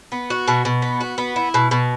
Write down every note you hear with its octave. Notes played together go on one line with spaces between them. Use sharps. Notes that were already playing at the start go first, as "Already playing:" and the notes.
B3
F#4
B2
B2
B3
F#4
B3
E4
B2
B2